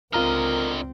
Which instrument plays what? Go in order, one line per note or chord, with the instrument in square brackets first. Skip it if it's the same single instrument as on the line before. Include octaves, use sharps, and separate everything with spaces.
[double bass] C#2 C4 [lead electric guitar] D3 D#5 [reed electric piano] F4 A#5 F6 [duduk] A#4